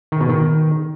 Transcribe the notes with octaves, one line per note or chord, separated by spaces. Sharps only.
D#3
B2
D#3